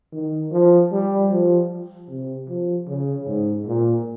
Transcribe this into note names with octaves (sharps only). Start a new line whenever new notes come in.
D#3
F3
G3
F3
C3
F3
C#3
G#2
A#2